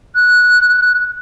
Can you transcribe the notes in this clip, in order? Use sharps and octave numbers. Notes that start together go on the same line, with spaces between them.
F#6